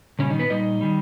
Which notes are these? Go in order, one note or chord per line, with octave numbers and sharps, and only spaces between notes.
A#2 C#3 G3 C#4
D#3 D#4
B3 B4
A#2 G3 D#4 D#5
D#3 G3